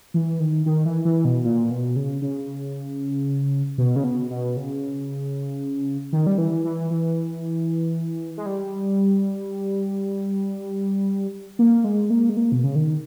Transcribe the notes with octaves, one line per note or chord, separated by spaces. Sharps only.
E3
D#3
D#3
E3
E3
B2
A#2
B2
C#3
C#3
B2
C#3
B2
B2
C#3
D#3
G3
E3
E3
E3
G#3
G3
A#3
G#3
A#3
G#3
A#3
B2
C#3
D#3